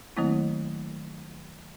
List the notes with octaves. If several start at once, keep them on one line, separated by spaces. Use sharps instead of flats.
D#3 F#3 A3 A#3 C4 E4